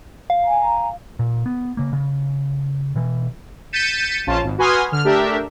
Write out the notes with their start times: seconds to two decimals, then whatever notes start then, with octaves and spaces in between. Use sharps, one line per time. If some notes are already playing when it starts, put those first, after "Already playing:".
0.30 F5
0.44 G#5 A#5
1.19 A#2
1.46 B3
1.77 C#3 A#3
1.93 C#3
2.96 B2 E3
3.73 G6 A6 B6 C#7 D#7 E7
4.27 A#1 C#4 F4 A5
4.44 G#1
4.58 F#4 B4 G#5 C6 D#6 F6
4.92 D3 F6
5.04 A3 D4 G4 A#4 E5